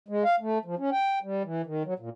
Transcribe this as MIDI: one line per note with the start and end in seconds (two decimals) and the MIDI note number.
0.08 0.24 56
0.24 0.36 77
0.40 0.58 57
0.65 0.75 53
0.79 0.90 61
0.92 1.19 79
1.23 1.43 55
1.44 1.62 52
1.66 1.83 51
1.85 1.94 54
1.99 2.09 46